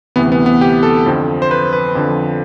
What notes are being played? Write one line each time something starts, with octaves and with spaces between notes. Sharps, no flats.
D2 C3 E3 B3
B3
B3
G4
A4
F2 D3 F3
C5
B4
B4
F2 D3 F3